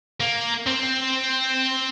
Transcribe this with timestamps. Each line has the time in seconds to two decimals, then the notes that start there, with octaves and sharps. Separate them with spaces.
0.20 A#3
0.66 C4